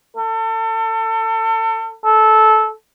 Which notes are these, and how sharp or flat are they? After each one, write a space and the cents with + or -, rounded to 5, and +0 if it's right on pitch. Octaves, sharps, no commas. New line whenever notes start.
A4 +35
A4 -15